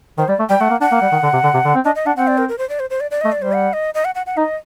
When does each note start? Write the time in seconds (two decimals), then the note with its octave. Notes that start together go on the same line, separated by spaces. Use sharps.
0.18 D#3 C5
0.28 G3 D5
0.39 A3
0.49 G3 G5
0.60 A3 F#5
0.70 A#3
0.81 D4 F#5
0.91 A#3
1.01 G3
1.12 D#3
1.23 D3
1.33 C3
1.43 D3
1.54 C3
1.65 D3
1.75 C4
1.85 D4 D#5
1.96 D#5
2.06 D4 F#5
2.16 C4 F#5
2.27 D5
2.38 A#4
2.49 A#4
2.58 C5
2.69 D5
2.80 C5
2.90 C5
3.00 D5
3.11 D5
3.21 A3 D#5
3.32 D5
3.39 G3 C5
3.53 F#5
3.73 D#5
3.94 D#5
4.05 F#5
4.15 F#5
4.26 F#5
4.37 D#4 D#5